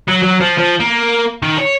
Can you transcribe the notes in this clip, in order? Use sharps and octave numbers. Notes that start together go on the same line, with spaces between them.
F#3
F#3
F3
F3
A#3
D#3
C#5